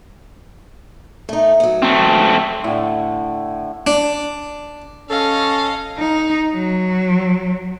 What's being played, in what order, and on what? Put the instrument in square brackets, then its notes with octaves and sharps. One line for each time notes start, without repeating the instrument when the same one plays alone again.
[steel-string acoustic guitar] A3 D#4
F#3 B3
[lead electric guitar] A3 C4
[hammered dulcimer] A2 D3
[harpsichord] D4
[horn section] C#4 A4 [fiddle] D#5 F5
[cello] D#4
F#3